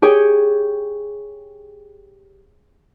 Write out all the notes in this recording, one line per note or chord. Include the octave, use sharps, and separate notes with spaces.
G4 G#4 C#5 G5